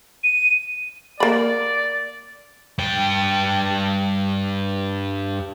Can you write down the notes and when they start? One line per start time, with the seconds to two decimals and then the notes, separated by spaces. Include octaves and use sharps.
0.24 D#7
1.20 A#3 D5 B5
2.79 G2 G5